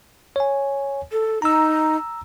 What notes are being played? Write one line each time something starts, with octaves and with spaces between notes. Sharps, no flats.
C#5 G#5
A4
D#4 A#5 E6